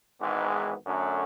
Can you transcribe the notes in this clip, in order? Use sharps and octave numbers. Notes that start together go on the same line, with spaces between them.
G#1 G#2 E3 G#3 B3
F#2 D3 F#3 A3 C#4